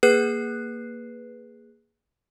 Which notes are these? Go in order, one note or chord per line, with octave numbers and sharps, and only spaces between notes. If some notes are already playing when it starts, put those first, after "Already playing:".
A#3 G#4 B4 F#6 C7